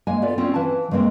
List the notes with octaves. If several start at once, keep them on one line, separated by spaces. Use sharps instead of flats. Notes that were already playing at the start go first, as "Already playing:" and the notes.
G#3 A#3 G#5
B3 F4 A4 D5
C4 C#4 F4
E3 B4 F5 A5
C#3 G#3 A#3 C4